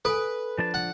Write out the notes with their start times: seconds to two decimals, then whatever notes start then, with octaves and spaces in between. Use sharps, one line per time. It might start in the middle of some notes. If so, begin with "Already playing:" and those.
0.05 A4 B4 G#5
0.58 F3 D4 A5
0.74 F#5